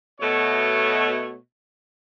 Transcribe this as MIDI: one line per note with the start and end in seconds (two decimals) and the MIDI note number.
0.20 1.36 47
0.20 1.36 57
0.20 1.36 73